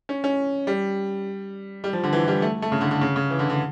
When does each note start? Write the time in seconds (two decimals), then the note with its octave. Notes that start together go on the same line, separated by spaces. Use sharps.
0.09 C#4
0.24 C#4
0.67 G3
1.84 G3
1.93 F3
2.04 D3
2.13 E3
2.28 G3
2.42 A3
2.62 A3
2.72 C#3
2.81 D3
2.91 D3
3.01 C#3
3.16 C#3
3.30 E3
3.39 D3
3.50 D3